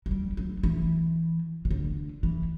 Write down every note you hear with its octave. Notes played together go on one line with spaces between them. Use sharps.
F#3
G3
F#3
E3
C3
D3
E3